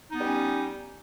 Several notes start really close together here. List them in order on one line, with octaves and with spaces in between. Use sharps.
D#4 B3 G3 C#4